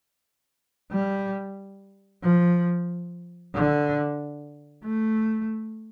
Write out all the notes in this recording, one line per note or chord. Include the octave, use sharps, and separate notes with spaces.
G3
F3
D3
A3